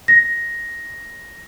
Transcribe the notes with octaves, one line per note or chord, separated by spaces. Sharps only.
A#6